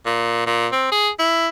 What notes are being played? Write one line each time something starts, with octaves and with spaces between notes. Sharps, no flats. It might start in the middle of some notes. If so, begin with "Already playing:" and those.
A#2
A#2
C4
G#4
E4